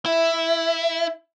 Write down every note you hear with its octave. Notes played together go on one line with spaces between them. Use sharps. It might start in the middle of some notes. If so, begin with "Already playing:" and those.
E4 E5